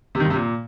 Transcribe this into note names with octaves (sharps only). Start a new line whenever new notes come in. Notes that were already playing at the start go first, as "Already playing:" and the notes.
C3
D#3
G2
C3
A#2